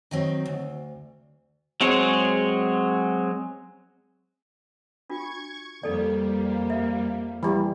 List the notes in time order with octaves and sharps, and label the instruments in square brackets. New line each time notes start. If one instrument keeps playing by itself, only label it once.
[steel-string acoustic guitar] D#3 F#3 C4
D2
[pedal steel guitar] F#3 G#3 C4 G#4 C#5
[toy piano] D4 F4 F#4 [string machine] C#6 G#6
[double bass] F2 A#3 [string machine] G3 [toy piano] D#4 A4 D5
[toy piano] E5
[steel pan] E3 G3